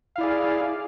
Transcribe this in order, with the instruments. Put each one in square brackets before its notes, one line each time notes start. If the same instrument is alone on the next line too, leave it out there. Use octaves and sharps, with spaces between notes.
[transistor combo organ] F5
E4
D5
G#4